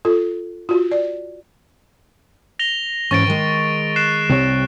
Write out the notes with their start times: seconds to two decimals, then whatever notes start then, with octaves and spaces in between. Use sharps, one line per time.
0.05 F4 A4
0.69 F4 F#4
0.92 D5
2.59 A#6 F7 G7
3.11 G#2 E3 C#4 C#6 A6 D7
3.27 D#3 G#3
3.96 F#6 C7 E7
4.29 C2 C3 C#5